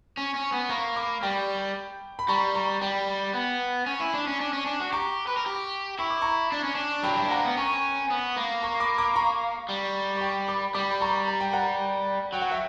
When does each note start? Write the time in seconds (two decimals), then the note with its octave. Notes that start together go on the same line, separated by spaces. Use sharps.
0.17 C#4
0.35 C#4
0.52 B3
0.69 A#3 A#5 C#6
0.96 B5 D6
1.23 G3 G5 B5
2.19 B5
2.28 G3 A#5 C#6
2.55 A#5 C#6
2.81 G3 G5 B5
3.34 B3
3.86 C#4
4.00 E4
4.14 D4
4.27 C#4
4.40 D4
4.53 C#4
4.66 D4
4.80 F#4
4.92 G4 A#5 C#6
5.27 B4
5.37 A#4
5.46 G4
5.99 E4 C#6
6.11 D6
6.22 A#5 C#6
6.52 D4
6.64 C#4
6.75 D4
7.03 F#3 G5 B5
7.15 G3
7.30 A#3 F#5 A#5
7.44 B3
7.57 C#4 A#5 C#6
8.10 B3
8.37 A#3
8.63 A#5 C#6
8.80 B5 D6
8.98 B5 D6
9.16 A#5 C#6
9.69 G3
10.16 C#6
10.21 G5 B5
10.48 B5 D6
10.74 G3 B5 D6
10.91 B5
11.01 A#5 C#6
11.27 A#5
11.41 G5
11.53 F#5 A#5
12.33 F#3 G5
12.42 F#5
12.51 E5 G5